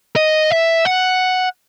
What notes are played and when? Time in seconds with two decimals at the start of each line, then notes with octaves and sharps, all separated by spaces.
0.16 D#5
0.51 E5
0.85 F#5